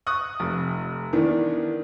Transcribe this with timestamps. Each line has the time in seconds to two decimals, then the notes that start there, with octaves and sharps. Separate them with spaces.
0.07 C#6 D#6 F#6
0.40 F1
1.13 D#3 E3 B3 D4